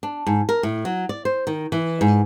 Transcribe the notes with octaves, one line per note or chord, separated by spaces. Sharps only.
D4
G#2
A#4
A2
F#3
D5
C5
D#3
E3
G#2